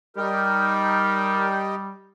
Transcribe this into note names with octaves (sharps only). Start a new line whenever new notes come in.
G3 D#4 G4 A#4